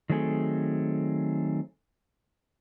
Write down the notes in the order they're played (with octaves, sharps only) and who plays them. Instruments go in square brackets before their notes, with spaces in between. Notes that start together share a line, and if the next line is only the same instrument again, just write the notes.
[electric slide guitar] D#3 F#3 A3 C4 G#4 A4